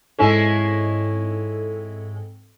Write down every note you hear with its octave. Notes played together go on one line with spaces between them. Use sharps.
G#2 G#3 C4 C#4 E4 A4